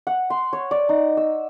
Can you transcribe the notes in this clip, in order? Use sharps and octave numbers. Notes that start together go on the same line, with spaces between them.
F#5
C6
C#5
D5
D#4
E6